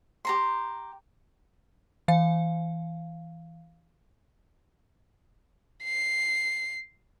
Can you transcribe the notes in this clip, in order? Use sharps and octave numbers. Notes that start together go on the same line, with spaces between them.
G4 A#5 C6
E3 F5
C7